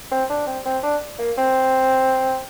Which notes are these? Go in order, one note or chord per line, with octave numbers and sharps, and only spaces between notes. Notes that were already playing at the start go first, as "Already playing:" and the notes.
C4
D4
C4
C4
D4
A#3
C4